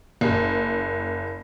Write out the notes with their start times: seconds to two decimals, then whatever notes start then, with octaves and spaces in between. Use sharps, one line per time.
0.21 F#1